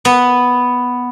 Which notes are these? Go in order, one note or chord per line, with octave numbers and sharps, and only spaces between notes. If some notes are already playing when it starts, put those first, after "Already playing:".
B3